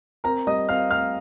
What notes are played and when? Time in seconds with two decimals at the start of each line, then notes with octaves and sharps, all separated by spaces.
0.24 C4 A#4 A#5
0.47 G3 D#5 D#6
0.69 C4 F5 F6
0.90 C4 F5 F6